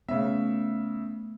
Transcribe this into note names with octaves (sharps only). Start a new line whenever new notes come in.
C#3 A3 B3 E5